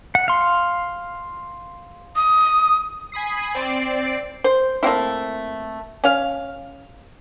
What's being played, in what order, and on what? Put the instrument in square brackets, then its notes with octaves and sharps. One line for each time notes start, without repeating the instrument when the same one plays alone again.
[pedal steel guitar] F#5
F5 C6
[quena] D#6
[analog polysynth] G#5 B5 D#6 C7
C4 D5 C7 D7
[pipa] C5
A3 A#3 C4 E4
C#4 F5